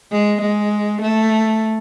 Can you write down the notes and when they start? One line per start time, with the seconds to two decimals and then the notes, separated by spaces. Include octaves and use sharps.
0.12 G#3
0.41 G#3
1.01 A3